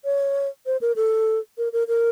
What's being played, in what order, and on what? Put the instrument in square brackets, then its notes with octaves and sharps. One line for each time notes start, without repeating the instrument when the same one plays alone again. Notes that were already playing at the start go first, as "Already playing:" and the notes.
[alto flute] C#5
C5
A#4
A4
A#4
A#4
A#4